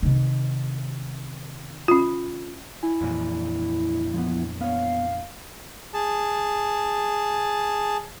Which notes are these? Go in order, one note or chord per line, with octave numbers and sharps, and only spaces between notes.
C3 D#3
C#4 F4
E4 G#5
F2 A#2 E3
F3 A#3 B3
B3 C#5 F5
G#4 A5